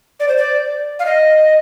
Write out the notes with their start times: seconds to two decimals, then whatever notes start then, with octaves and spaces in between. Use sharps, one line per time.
0.20 D5
0.28 C5
0.37 D5
0.99 F5
1.05 D#5